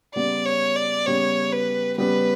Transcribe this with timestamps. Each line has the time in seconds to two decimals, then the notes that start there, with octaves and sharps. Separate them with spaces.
0.15 C#3 G3 B3 D5
0.46 C#5
0.76 D5
1.07 C#3 G3 B3 C#5
1.53 B4
1.98 C#3 G3 B3 B4